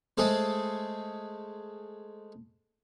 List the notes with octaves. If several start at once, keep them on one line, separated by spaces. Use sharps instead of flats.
G#3 A3 G#4 A4 C5